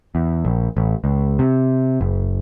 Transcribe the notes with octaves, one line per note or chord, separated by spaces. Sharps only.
E2
A#1
A1
C#2
C3
F#1